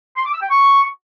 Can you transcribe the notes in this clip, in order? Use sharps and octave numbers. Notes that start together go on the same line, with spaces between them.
C6
D6
E6
G5
C#6